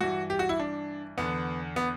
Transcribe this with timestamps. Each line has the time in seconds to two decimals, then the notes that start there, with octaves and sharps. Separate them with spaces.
0.01 G2 E3 F#4
0.30 G4
0.39 F#4
0.49 E4
0.60 D4
1.18 E2 D3 B3
1.76 B3